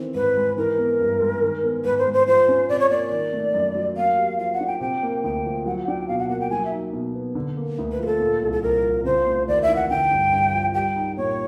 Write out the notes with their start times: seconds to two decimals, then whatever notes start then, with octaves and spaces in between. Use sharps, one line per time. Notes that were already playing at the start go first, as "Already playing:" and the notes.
Already playing: D#3 E3 C4
0.15 G#2 B4
0.37 G#3
0.57 E3 A#4
0.78 B3
1.00 G2
1.20 G#3
1.42 D#3
1.63 B3
1.84 G#2 B4
1.99 C5
2.06 G#3
2.13 C5
2.27 F3 C5
2.48 C#4
2.69 C3 D5
2.80 C#5
2.90 A#3 D5
3.12 D#3
3.33 A3
3.54 F#2
3.75 F#3
3.96 A#3 F5
4.18 G4
4.39 F3 F5
4.53 F#5
4.60 D4
4.67 G5
4.81 C3 G5
5.03 A#3
5.24 D2 G5
5.45 F3
5.66 F#3 F#5
5.87 D4 G5
6.08 B2 F5
6.19 F#5
6.29 A#3 F#5
6.40 G5
6.50 F#3 G#5
6.65 E5
6.72 D#4
6.93 B2
7.15 B3
7.35 D3
7.57 A#3
7.79 D2
7.92 B4
7.99 F3 A#4
8.06 A4
8.20 A#2
8.42 C2
8.52 A4
8.62 C2 A#4
8.84 F3
9.05 C#3 C5
9.26 A3
9.48 D#2 D5
9.62 E5
9.68 E3
9.76 F#5
9.89 D3 G5
10.11 G2
10.32 G2
10.54 F3
10.74 G3 G5
10.96 D#4
11.17 A#2 C#5